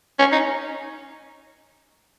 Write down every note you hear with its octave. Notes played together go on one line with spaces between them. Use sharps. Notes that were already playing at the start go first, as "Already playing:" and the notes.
C#4
D#4